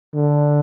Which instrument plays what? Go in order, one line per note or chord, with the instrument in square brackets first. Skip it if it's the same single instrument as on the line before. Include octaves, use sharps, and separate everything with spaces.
[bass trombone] D3